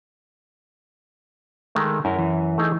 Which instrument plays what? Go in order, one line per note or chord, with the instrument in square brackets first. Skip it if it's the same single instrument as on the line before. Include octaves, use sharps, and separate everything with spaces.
[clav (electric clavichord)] D#3 G#3 A3
[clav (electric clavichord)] F#2 [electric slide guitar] E4 A#4
[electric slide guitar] E3
[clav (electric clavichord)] A3 D#4 G#4